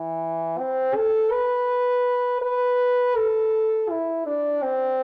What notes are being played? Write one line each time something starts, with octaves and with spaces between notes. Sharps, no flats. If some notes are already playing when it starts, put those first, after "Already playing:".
Already playing: E3
C4
A4
B4
B4
A4
E4
D4
C4